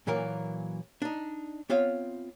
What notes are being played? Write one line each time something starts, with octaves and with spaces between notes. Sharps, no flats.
A#2 E3 F#3 A#3 A#4
D4 D#4
B3 C4 F4 C#5 E5 F5